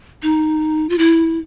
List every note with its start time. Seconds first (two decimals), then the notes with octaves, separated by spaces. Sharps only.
0.23 D#4
0.89 F4
0.98 E4